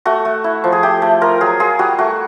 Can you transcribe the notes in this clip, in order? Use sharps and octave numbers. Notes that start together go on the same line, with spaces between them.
A3 F#4
A3
E4
F3
G#4
A3 G4
A3
F4 A#4
F#3 G#4
F4 G#4
G3 F#4
A3 F#4